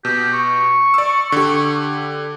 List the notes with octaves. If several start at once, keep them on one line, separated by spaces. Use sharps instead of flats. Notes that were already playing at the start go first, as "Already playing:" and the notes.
B2 G4
C#6
D5 E6
D3 G4